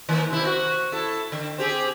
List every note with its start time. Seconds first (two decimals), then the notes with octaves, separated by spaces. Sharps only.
0.09 D#3 A#3
0.30 C3 E4
0.45 F#4
0.92 E4 A4
1.32 D3
1.58 C4 G4 G#4